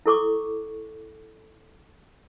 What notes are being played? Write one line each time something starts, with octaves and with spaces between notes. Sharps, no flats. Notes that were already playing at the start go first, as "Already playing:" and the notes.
E4 A4 C#6 D6